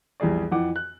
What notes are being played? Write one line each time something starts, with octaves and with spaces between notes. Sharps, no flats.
A#1 E2 G3 G#4 D5
F2 E3 F#5 D6
F#6